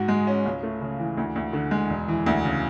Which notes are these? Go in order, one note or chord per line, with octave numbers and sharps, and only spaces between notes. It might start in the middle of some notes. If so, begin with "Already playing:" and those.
Already playing: G#2 F#4
G#3
C#4
C#2
A3
C#3
E3
D2
D2
D3
G#3
E1
E3
D2
C#3